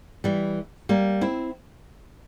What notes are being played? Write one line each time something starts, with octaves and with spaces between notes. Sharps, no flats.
E3 G3
G3 A#3
C4 E4